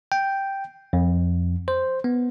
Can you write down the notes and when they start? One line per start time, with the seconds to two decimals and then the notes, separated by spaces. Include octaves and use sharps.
0.12 G5
0.93 F2
1.68 C5
2.04 B3